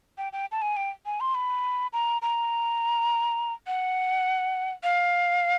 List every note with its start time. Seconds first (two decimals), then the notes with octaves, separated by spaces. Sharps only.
0.18 G5
0.33 G5
0.52 A5
0.62 G#5
0.77 G5
1.06 G#5
1.20 C6
1.35 B5
1.93 A#5
2.22 A#5
3.67 F#5
4.83 F5